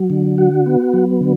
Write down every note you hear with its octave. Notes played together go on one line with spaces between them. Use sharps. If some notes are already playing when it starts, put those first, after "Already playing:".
Already playing: F#3
D3
F#4
B3
F#3
D3